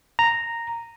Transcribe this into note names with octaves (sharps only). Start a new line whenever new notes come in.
A#5